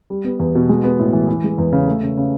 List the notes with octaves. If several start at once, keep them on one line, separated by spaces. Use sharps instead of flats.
G3
B3
E2
B2
G#3
B3
A2
E3
E3
G#3
E2
C#3
A3
C#3
C#3